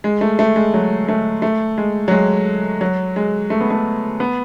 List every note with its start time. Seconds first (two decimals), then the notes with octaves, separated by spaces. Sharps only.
0.04 G#3
0.21 A3
0.39 A3
0.56 G#3
0.74 F#3
1.09 A3
1.42 A3
1.78 G#3
2.08 F#3
2.11 G#3
2.81 F#3
3.16 G#3
3.50 A3
3.61 B3
3.70 A3
4.20 B3